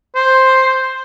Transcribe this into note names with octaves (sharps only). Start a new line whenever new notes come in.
C5